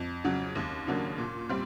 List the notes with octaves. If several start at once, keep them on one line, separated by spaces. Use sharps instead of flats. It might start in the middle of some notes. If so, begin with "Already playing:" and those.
Already playing: F2
C#3 F#3
D#2
C#3 F#3 A#3 D4
A#2
G3 C4